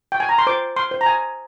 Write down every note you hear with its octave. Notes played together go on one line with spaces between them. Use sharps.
G5
G#5
A#5
C6
C5 D6
C6
C5
A#5
G#5